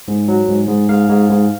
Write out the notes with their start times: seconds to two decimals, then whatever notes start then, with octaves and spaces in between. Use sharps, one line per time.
0.08 G#2
0.28 F#3
0.48 G#2
0.68 G#2
0.89 G#2 F5
1.09 G#2
1.29 G#2